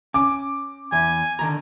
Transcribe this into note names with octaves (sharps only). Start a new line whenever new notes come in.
C#4 D6
E2 G#5
D3 D#3 A#5